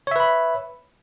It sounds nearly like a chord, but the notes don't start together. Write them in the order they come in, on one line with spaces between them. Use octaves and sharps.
C#5 E5 B4 B5